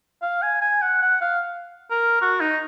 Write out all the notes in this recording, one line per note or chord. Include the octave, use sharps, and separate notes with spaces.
F5
G#5
G#5
F#5
F#5
F5
A#4
F#4
D#4